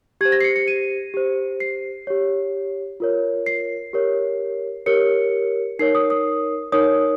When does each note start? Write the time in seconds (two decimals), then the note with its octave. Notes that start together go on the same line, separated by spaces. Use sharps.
0.21 G4 C5 G#6
0.32 A#6
0.41 C7
0.44 C#7
0.56 C#7
0.68 D#7
1.14 G4 C5
1.60 C7
2.07 G4 C#5
3.00 F4 A#4 C#5
3.46 C7
3.93 G4 A#4 C#5
4.86 G4 A#4 C#5 C#7
5.79 D#4 A#4 C#5 C7
5.95 D#6
6.10 D#6
6.72 D#4 A#4 C#5 D#6